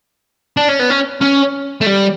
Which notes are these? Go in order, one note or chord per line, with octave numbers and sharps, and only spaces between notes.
D4
C#4
B3
C#4
C#4
A3
G3